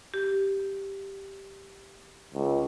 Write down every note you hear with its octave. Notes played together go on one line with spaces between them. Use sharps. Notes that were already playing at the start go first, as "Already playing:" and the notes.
G4
C#2